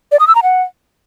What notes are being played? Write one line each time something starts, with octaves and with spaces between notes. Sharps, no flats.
D5
D#6
E6
A#5
F#5